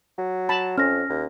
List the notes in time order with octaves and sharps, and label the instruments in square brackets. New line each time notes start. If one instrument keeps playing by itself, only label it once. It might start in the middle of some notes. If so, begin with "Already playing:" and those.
[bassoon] F#3
[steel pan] A5 B5
[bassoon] F2 [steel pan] C#4 [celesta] F6 A#6
[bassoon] D#2